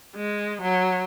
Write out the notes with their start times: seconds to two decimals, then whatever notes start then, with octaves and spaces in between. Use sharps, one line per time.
0.16 G#3
0.62 F#3